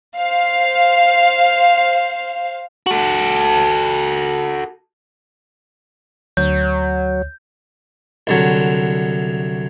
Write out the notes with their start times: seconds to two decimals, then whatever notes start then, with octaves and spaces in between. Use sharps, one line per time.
0.16 C5 F5
2.86 F#4 A4
6.37 D2 F#3 C#5 G6
8.27 C2 D3 F#3